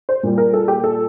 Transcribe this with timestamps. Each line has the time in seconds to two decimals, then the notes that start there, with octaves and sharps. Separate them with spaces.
0.09 C5
0.23 A#2 G3
0.38 A#4
0.53 A4
0.68 G4
0.84 A4